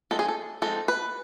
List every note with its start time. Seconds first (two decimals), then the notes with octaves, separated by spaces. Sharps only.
0.11 F3 G#3 C4 D#4 A4
0.19 G#4
0.28 A4
0.62 F3 G#3 C4 D#4 A4
0.88 B4